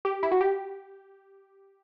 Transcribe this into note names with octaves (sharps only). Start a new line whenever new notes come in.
G4
E4
F#4
G4